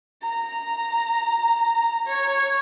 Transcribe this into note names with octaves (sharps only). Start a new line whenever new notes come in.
A#5
C#5